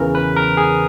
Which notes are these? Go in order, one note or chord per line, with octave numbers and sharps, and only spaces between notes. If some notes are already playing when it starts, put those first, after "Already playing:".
Already playing: E2 C#3 E3 A#4
B4
A#4
G#4